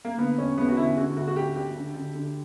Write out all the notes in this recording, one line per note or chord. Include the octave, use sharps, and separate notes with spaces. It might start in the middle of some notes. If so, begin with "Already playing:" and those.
A#3
D3 B3
E1 C#4
E2 B3
F#4
D3 E4
D3 F#4
D2 F#4
F#4
D3 G4
D2 G4
D3
D3
D3